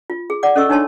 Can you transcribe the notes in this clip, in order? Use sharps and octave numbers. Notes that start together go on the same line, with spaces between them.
F4
G#4
D5 F#5 D6
C#4 A4 D#5 C#6 E6
D4 D#4 C#5 A5 C6